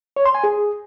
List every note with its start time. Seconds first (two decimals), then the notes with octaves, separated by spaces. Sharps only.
0.17 C#5
0.26 C6
0.35 G#5
0.44 G#4